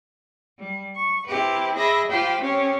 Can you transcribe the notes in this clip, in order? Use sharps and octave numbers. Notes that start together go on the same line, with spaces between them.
G3
C#6
C4 E4 G4 B4
G#4 D#5 E5 B5 D6 A#6
F4 G4 C5 G5 B5
C4 C#4 G4 C#5